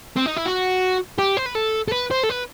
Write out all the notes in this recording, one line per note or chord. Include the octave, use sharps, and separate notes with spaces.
C4
D#4
E4
F#4
G4
C5
B4
A4
A4
B4
C5
A4
B4